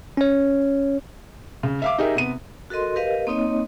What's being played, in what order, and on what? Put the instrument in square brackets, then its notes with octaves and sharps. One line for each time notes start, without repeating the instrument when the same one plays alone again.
[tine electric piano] C#4 C#5
[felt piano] C#3
E5 F5 D6
D#4 G4 G#4 A#4 E5
C3 B3 D#7
[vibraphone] F#4 A4 A#4 D#5 C6
G4 A#4 B4 D#5 F5
A#3 C4 D#4 C#5 D#5